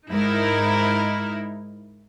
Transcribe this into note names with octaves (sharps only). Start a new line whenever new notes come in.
G#2 D#4 E4 A#4